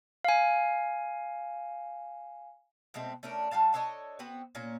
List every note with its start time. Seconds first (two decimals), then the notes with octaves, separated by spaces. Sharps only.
0.25 F5 G#5
2.94 B2 G#3 A3 C4
3.23 A3 C#4 D4 A#4
3.51 G3 D4 F5 A5
3.74 D4 A4 C#5 D#5
4.19 B3 C4 F#4 B4
4.55 A#2 A#3 C#4